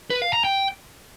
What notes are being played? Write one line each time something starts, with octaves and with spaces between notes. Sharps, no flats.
B4
F5
A#5
G5